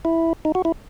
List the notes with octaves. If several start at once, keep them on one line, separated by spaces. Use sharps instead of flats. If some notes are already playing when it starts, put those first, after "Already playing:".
E4
D#4
F#4
E4